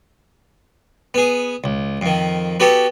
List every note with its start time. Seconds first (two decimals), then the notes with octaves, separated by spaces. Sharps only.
1.14 B3 G#4
1.64 C#2
2.01 F2 D#3
2.60 B3 F#4 G4 A4